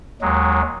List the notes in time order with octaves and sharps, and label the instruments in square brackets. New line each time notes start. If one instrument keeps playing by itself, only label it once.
[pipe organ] D#2 F#3 G#3